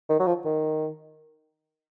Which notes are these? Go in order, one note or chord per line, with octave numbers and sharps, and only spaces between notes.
D#3
F#3
F3
D#3